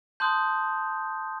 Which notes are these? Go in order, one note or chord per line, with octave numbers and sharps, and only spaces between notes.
A5 C6 D#6 F#6 G6